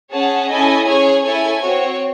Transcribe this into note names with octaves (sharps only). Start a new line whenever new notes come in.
C#4 G#4 C#5 F#5 A5
C#4 E4 A4 D#5 G#5
C#4 G#4 C#5 G#5
E4 A4 C#5 G#5
C4 F#4 C#5